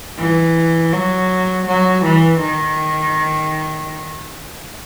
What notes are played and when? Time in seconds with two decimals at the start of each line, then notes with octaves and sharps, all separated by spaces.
0.19 E3
0.93 F#3
1.67 F#3
2.05 E3
2.41 D#3